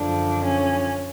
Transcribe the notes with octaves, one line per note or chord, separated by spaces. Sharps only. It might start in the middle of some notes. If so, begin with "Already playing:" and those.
Already playing: F#2 D3 F3 D4
C#4